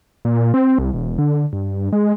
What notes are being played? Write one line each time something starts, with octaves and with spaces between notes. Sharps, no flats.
A#2
C4
C2
E1
D3
G2
G#3